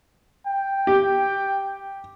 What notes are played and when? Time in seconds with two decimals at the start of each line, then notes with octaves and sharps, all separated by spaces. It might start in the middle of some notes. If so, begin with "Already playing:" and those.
0.47 G5
0.87 G4